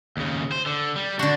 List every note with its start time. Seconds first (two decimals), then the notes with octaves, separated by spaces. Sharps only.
0.17 D#2 C#3
0.52 C5
0.66 D3
0.96 G3
1.19 D3 D4 F#4